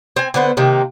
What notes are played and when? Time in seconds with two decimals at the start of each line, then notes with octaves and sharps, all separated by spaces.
0.16 C4 G#5
0.34 D3 B3 B4 C5
0.57 C3 D#3 A#3